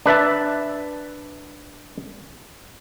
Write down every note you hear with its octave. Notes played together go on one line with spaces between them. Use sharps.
D4 B4 E5 A5